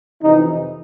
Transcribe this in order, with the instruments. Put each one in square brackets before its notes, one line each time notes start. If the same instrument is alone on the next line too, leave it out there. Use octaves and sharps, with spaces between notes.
[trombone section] F2 C3 E3 D#4